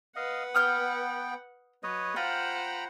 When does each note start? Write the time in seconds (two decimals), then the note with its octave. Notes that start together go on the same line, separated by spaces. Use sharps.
0.16 B4 D#5 F5 F#5
0.55 B3 G5 D#6 F6 G6
1.83 F#3 B4 C#5 D#5
2.16 F4 C5 F#5 G5 A#5 B5